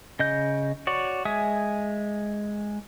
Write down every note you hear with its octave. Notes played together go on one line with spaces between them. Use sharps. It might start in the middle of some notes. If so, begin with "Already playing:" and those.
C#3 D#5 G6
F#4 C#5 D5
G#3 E5 G#5 D#6